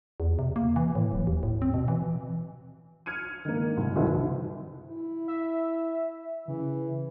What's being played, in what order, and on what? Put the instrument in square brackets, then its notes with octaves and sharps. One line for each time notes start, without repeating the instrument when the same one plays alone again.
[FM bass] E2
C3
A#3
E3
A2
D1
D#2
A2
C4
B2
E3
[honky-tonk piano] F6 G#6 C#7 D#7
D#3 G#3 A#3
C2
C2 F2 D#3 E3 F#3
[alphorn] E4
[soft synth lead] E5
[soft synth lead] C#3 [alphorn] E3